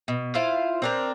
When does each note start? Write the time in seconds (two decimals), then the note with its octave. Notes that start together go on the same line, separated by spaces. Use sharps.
0.08 B2
0.35 E4 F4 C5 F5
0.82 C4 D4 A#4